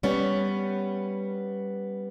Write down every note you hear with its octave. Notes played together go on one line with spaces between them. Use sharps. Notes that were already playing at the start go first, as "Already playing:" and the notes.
G3 B3 C#4